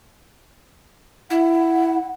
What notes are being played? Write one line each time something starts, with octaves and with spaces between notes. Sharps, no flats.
E4 F#5